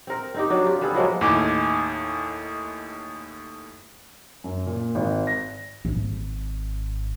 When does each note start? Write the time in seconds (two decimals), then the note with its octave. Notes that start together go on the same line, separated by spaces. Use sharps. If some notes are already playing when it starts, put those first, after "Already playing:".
0.07 C4 A#4
0.34 C4 D#4 G4
0.50 F#3 D4
0.65 F4 G4
0.81 G3 B3 G#4 A4
0.95 F3 F#3 G#3 A#3
1.21 D#2 A2 D#4 G#5 D6
4.44 F#2
4.66 A#2
4.95 G#1
5.27 A#6
5.85 G#1